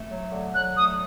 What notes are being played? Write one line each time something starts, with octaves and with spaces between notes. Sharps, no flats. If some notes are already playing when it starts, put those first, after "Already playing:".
Already playing: A3
F#3
D3
F#3 F#6
A3 D#6